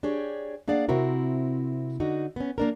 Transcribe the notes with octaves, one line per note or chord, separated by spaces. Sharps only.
D4 G4 G#4 C#5
A#3 D4 G#4 D5 F5 F#5
C3 C4 E4 F#4 A#4
D3 D#4 F#4
B3 C#4
A#3 D4 A#4